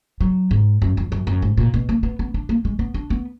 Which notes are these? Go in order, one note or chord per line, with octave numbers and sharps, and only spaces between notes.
F#3
G#2
F#2
F2
F#2
F#2
G#2
A#2
B2
A#3
B3
B3
D4
A#3
G#3
B3
D4
B3